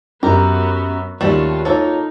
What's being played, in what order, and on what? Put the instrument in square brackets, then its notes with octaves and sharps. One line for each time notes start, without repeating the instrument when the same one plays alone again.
[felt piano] F#2 [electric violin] B3 F#4 [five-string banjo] G4 A#4
[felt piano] D#2 E7 [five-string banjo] G3 A3 C#4 [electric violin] F4 F#4
[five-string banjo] A#3 A4 [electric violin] D#4 [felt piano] F4 C#5